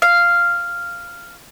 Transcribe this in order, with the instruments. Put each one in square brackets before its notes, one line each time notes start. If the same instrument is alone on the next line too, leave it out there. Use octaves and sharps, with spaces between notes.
[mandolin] F5